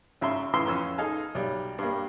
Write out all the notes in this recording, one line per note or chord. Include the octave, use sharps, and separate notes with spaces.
G#1 C#3 E5 A#5 C6
A2 C#3 E3 C6 E6 F6
F2 E3 C#4 E6
D#4 G#4 A4 F5 G#5
B1 G3
G2 G3 A#3